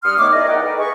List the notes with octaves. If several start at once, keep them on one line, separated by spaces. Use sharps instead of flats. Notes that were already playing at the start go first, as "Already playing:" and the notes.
G2 F#5 C6 D#6 F6
D#3 A3 B3 C#5 C#6 D6
E4 G#4 A#4 D5 D#5
D#4 F#5 G5
A4 B4 D#5
G#4 B4 C#6